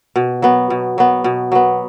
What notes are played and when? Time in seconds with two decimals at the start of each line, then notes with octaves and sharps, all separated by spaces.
0.16 B2
0.42 F#3 B3
0.70 B2
0.98 F#3 B3
1.24 B2
1.52 F#3 B3